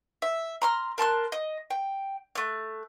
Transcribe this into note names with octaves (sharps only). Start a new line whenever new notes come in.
E5
A#5 C6 F6
A#4 A5 C6 F#6
D#5
G5
A3 F#6